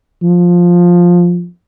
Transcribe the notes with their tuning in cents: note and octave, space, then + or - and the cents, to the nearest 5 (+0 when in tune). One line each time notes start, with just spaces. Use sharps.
F3 +10